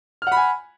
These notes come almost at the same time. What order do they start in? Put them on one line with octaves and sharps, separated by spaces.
F6 F#5 B5 G#5